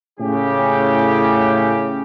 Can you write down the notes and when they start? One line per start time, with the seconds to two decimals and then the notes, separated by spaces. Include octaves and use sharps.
0.20 A2 C#3 C#4 G4